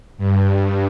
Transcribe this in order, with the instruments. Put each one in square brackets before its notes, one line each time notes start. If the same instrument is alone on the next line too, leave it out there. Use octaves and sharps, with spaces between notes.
[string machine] G2